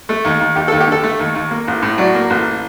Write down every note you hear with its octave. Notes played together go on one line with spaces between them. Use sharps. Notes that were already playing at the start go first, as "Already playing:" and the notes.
A3
D#2
D#2
D#2 G4
A4
D#2
G4
D3 A4
A3
D#2
D#2
A#3
A1
A2
F#3 D5
A#3
A1